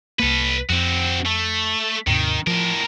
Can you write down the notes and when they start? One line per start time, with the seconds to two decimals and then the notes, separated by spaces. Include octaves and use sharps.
0.20 C2 A#3 A4 B4
0.70 F2 C4 F#4
1.26 A3
2.07 D#2 G#2 C3 D#3
2.47 A2 F3 A#4